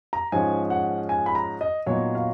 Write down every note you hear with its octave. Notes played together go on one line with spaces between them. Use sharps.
A#5
G#2 F3 G#3 C#4 G#5
F#5
G#5
B5
A#5
D#5
A#2 F#3 B3 D#4 C#5
F5